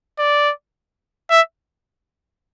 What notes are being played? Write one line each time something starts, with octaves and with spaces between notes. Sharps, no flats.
D5
E5